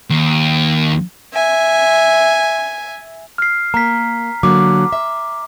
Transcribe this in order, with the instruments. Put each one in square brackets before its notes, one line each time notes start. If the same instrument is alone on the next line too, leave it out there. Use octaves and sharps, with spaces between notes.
[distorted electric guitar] D#2
[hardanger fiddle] E5 G#5
[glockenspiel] F6 C7
[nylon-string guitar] A#3 [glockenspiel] A#5 B6
[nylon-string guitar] D3 F#3 A#3 [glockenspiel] D6
[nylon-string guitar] E5